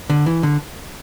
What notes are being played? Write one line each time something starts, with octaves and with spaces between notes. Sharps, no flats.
D3
E3
D3